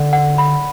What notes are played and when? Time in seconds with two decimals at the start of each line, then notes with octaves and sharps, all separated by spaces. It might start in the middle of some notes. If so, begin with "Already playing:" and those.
Already playing: D3 D5 F#5
0.13 F#5
0.38 B5